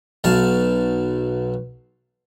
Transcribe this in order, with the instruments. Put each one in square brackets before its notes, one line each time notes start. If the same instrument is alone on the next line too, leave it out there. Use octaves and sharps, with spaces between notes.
[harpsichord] B1 F5 A5